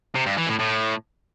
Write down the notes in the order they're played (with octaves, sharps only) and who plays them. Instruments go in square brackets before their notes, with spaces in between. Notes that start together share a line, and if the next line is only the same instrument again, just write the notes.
[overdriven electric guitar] C3
G2
E3
A2
A2